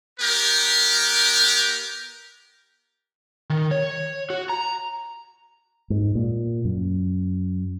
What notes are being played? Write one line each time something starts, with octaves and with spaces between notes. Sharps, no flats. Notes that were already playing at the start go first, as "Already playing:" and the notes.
B3 G4 A#4
D#3
C#5
F#4
A#5
G#2
A#2
F#2